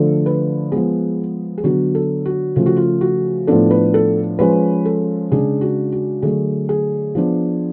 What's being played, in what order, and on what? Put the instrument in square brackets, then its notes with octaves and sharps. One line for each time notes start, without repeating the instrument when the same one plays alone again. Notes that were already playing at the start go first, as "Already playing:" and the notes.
Already playing: [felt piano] D3 F3 A3 D4 A4
B4
F3 G#3 B3 G#4
G#4
D3 F#3 B3 D4 F#4
A4
F#4
C#3 F3 A3 F4
F#4
F4
F#4
A2 F3 B3 D4 A4
B4
A4
F3 G#3 C#4 B4
A4
C#3 G#3 D4 G#4
F#4
F#4
D3 F#3 A3 G#4
G#4
F3 B3 D4